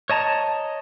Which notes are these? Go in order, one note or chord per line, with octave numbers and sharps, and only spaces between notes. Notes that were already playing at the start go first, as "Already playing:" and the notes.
C#5 D#5 A5 A#5